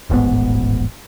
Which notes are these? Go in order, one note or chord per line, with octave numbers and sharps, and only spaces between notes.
D#1 A1 G#2 B3